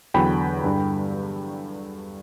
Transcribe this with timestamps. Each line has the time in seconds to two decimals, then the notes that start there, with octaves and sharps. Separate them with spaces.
0.14 E2 D3 F#3 G5 B5
0.64 G2 D3 G3